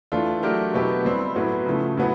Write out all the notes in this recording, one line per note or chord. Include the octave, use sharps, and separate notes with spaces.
E3 A3 D4 F4
F#3 A3 D4 G4 A#4
B2 F#3 B3 E4 G4
G3 C4 E4
A2 F#3 B3
C#3 F3 A3
A2 F#3 B3